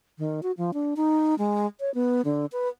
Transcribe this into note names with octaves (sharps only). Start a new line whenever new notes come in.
D#3
F#4
F3
D4
D#4
G#3
C#5
B3
D3
B4